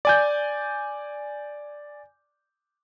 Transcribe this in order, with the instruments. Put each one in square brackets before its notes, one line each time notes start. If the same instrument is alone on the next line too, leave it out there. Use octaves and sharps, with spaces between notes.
[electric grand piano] D5 G#5 G6